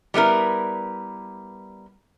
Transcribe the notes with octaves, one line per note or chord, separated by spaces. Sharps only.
G3 B3 E4 A#4